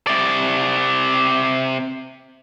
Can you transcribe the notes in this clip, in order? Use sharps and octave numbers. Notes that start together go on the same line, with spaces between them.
C3 D5